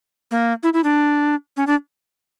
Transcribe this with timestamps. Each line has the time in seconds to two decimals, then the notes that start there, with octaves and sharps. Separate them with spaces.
0.31 A#3
0.63 E4
0.73 E4
0.84 D4
1.57 C#4
1.67 D4